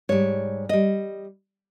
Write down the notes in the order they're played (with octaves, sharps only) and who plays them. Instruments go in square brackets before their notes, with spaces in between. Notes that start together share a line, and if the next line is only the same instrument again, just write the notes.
[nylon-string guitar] G#2 G3 C#5
G3 D#5